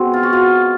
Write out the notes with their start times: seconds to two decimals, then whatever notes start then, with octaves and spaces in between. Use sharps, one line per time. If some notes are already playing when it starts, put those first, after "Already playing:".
Already playing: B2 G#3 C4
0.14 F4
0.23 F#4
0.33 F4